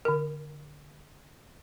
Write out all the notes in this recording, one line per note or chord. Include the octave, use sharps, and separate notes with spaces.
D3 A#4